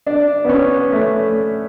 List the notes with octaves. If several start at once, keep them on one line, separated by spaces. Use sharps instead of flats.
D4
B3
C#4
A3